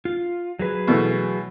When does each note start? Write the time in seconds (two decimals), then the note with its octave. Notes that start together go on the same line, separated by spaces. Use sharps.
0.05 F4
0.59 F#3 G#4 B4
0.87 B2 E3 A3